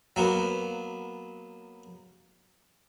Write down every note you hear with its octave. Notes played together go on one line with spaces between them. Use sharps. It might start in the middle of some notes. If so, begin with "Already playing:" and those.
F#3 A#3 B3